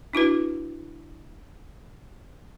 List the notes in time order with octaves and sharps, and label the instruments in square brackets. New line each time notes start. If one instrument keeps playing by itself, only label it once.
[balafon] D4 E4 F#4 B4